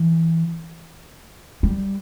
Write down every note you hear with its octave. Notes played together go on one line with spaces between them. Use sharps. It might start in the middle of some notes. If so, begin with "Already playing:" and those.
Already playing: E3
G3